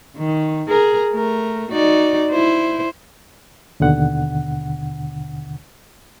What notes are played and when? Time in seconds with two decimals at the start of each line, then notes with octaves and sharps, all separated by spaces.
0.17 D#3
0.68 G#4 A#4
1.13 A3 A#4
1.71 D#4 F#4 D5
2.31 E4 C5
3.80 D#2 B2 D3 F#5